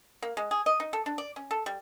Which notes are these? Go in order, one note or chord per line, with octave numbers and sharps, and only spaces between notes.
A#3
G#3
G#4
D#5
D#4
A4
D4
D5
C#4
A4
G3